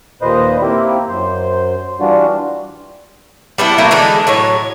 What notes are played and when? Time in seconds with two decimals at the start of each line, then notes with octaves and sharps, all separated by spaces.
0.22 D#2 A#2 B4 C5 D#5
0.62 A#3 C4 E4 G4
1.09 F#2 C5
2.00 E3 G3 D4 F4 F#4
3.58 G3 B3 D4 E4
3.78 F#3 A3 A#3 E4
3.91 D3 E3 G#3 D4
4.27 A2 F#3 C#5